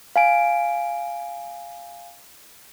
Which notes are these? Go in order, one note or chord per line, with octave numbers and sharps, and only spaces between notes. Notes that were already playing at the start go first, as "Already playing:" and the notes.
F5 G#5 D7